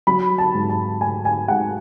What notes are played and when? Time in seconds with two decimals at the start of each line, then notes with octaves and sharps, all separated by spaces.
0.07 F#3 B5
0.38 A5
0.54 G#2
0.69 A5
1.01 A3 G#5
1.25 G#5
1.48 G#2 F#5